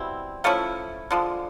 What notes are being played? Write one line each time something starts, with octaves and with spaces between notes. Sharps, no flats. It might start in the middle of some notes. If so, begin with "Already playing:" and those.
Already playing: B2 G3 C4 E4
F3 A3 C#4 E4
D3 F3 G#3